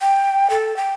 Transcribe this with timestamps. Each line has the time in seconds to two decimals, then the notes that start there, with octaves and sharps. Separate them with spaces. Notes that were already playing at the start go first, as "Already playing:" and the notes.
0.01 G5
0.50 A4
0.76 G5